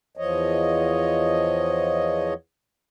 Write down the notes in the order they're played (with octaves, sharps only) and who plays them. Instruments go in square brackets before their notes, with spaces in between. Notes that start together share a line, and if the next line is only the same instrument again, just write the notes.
[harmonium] E2 F3 C#5 D#5